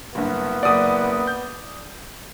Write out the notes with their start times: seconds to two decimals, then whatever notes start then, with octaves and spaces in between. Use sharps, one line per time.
0.15 F#1 G2 B3
0.63 F#1 D5 F#5 D#6
1.27 G6